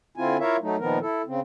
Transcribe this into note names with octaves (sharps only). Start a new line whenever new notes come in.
D3 C4 E4 F4 G#5
E4 F4 A#4 C#5 E5 F5
F#3 A3 D#4
A#2 D#3 F3 B3 A#4
E4 A4
C#3 C4